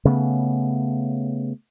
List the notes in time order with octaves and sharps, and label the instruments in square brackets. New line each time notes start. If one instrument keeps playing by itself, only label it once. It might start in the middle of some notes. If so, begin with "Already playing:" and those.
[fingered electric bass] C#3 A3 B3